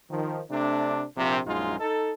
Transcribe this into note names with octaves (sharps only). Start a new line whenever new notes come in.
D#3 F3
C3 A3 D4
A#1 C3
A#1 F#2 G#3 D#4 F4
D#4 A4